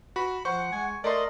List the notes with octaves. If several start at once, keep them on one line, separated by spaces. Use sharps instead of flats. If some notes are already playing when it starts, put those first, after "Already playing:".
F#4 B5
F3 C5 F#5 C#6
G#3 G#5
A3 A#4 D5 D#5 C6